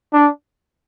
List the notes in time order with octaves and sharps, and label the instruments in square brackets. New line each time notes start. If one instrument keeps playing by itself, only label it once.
[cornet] D4